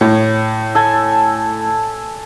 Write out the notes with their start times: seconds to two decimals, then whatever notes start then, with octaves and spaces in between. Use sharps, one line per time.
0.01 A2
0.75 A4 G#5